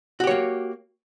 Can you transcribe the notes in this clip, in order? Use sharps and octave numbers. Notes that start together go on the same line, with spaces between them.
A#3 F#4 G4 C#5